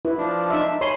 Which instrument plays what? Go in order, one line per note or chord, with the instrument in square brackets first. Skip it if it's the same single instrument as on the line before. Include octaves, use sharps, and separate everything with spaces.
[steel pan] E4 B4
[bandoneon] F3 D4
[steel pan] D#4 E5
[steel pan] C#5 C6 [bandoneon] G#5 B5